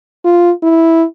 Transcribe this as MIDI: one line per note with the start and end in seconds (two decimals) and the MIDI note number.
0.24 0.51 65
0.63 1.04 64